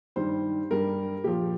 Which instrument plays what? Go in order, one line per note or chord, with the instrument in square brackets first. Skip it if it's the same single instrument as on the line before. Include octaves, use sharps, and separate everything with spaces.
[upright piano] G2 D#3 G3 C5
G2 G3 A#4
A#2 F3 G4